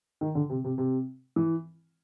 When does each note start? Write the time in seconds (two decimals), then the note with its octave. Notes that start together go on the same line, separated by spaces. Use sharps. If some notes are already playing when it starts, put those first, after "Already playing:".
0.21 D#3
0.35 D3
0.50 C3
0.64 C3
0.78 C3
1.36 E3